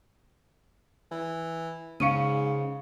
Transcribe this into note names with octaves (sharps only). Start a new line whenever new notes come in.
E3
G#2 C#3 F5 C#6 C#7 D#7